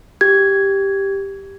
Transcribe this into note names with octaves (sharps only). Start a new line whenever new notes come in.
G4 G#6